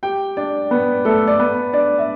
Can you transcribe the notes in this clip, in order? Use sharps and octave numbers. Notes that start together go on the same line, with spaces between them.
G4 G5
D4 D5
B3 B4
A3 A4
D5
B3 B4
D4 D5
E5